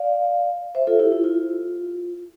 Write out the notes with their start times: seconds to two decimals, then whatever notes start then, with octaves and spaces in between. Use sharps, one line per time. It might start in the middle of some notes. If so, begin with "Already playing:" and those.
Already playing: D5 F5
0.75 C5 E5
0.87 F4 A4
0.99 E4 G4
1.12 E4
1.24 F4